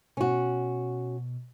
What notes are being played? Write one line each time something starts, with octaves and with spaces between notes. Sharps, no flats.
B2 C#4 F#4